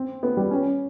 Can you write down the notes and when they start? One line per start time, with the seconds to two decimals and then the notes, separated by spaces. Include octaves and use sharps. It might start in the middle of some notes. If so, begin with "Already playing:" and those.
Already playing: C4
0.23 B3
0.37 G3
0.51 C#4